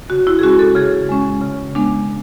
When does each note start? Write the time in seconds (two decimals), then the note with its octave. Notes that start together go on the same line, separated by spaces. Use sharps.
0.10 C#3 F#4
0.27 E4
0.39 G#4
0.43 G#3 C#4 F#4
0.59 A4
0.75 C#3 G#4
1.09 G#3 C#4
1.42 C#3
1.75 G#3 B3 D4